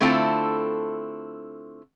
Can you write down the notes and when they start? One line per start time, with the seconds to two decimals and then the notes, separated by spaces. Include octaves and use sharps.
0.01 D3 A3 C4 E4 F4 A4